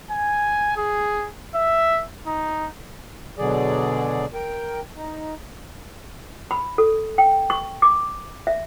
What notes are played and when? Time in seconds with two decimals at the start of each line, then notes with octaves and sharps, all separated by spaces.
0.11 G#5
0.77 G#4
1.55 E5
2.27 D#4
3.38 B2 D3 F#3 G#4 D5
4.34 A#4 G5
4.96 D#4
6.51 B5
6.78 A4
7.18 G5
7.50 C#6
7.82 D6
8.47 E5